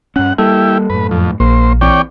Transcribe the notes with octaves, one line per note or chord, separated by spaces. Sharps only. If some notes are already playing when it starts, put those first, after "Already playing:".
G2 C#4 F#5
G3 A#3 E4 G4 A4
F#2 A2 B4
F2
A#1 A#3 C5
E3 C4 C#5 D5 G5